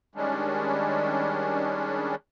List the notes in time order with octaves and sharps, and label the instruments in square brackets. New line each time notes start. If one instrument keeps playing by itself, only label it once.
[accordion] D#3 G3 G#3 C#4 D4